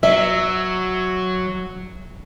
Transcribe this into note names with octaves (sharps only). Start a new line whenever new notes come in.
F#3 E5